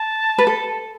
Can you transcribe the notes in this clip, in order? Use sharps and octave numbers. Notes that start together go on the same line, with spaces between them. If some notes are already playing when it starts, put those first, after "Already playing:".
Already playing: A5
B4
A4